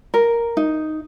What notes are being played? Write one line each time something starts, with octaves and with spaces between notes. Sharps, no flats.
A#4
D#4